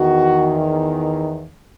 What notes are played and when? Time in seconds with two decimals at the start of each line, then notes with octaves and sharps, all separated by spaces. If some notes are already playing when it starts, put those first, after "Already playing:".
Already playing: E2 D#3 F#4